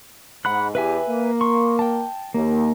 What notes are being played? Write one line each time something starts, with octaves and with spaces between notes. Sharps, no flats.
G#2 F#5 B5 F#6
E2 G4 B4 E5 G#5
A#3
C6 C#6
G5 A5
D#2 A#3